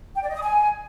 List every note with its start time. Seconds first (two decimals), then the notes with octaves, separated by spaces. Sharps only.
0.16 G5
0.22 D5
0.29 D#5
0.36 D#6
0.43 G#5